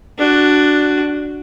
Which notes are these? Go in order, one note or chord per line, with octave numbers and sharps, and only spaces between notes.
D4 F#4